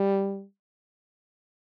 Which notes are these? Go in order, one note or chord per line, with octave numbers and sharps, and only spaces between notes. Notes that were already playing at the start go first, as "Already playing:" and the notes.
Already playing: G3